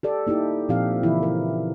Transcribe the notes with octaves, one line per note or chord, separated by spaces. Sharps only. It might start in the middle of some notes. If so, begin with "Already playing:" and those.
G4 A4 D5
A#3 D#4 E4 G4
A#2 F3 C4 G4 F5
C#3 E3 E4
A#4